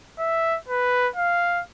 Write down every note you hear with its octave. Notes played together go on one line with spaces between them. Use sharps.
E5
B4
F5